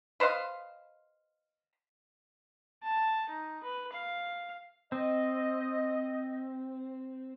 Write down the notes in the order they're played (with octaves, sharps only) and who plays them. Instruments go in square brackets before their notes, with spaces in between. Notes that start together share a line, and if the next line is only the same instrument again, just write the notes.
[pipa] B4 C5 D#5 F5
[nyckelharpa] A5
D#4
B4
F5
[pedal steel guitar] C4 [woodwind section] D#5